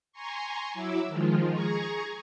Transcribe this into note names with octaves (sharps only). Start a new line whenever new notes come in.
G#5 A#5 C6 C#6
F#3 E4 D6 E6
D#3 F3 G#3 F4
G#4 G#5 A#5 C#6